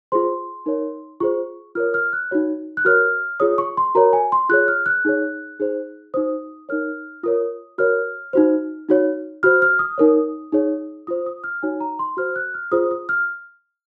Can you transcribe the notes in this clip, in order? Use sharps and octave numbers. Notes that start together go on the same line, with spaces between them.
F4 G#4 C5 C6
D#4 A#4 C#5
F4 G#4 C5 C#6
F4 A#4 C#5 F6
F6
F#6
D#4 F#4 C#5
F#6
F#4 A#4 C#5 F6
F4 G#4 C#5 D#6
C#6
C6
F#4 A#4 C#5 A#5
G#5
C6
F4 G#4 C#5 F#6
F6
F#6
D#4 G#4 C#5
D#4 G#4 C5
D#4 F#4 C5 D#6
D#4 A#4 C#5 F6
F4 A#4 C#5 D#6
F#4 A#4 C#5 F6
D#4 F#4 C5
D#4 F#4 C#5
F#4 C5 F6
F6
D#6
D#4 A#4 C#5
D#4 G#4 C#5
F4 C5 D#6
D#6
F6
D#4 F#4 C#5 G#5
A#5
C6
F#4 C5 F6
F#6
F6
F4 G#4 C5 D#6
D#6
F6